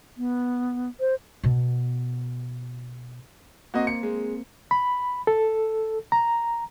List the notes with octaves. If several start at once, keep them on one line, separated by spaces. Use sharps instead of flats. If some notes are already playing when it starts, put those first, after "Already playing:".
B3
C5
B2 B3
A#3 C4 F#4 D#5
C#7
G#3
B5
A4
A#5